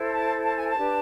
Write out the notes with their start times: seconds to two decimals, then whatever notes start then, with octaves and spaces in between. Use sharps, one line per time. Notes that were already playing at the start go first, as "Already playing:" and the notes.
Already playing: E4 A4 C5
0.10 A5
0.43 A5
0.55 G#5
0.68 A5
0.77 D4 G4 B4